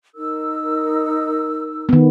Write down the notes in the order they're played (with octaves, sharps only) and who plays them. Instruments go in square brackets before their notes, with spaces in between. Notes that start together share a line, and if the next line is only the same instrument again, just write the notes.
[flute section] D#4 A#4 E6
[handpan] D#3 B3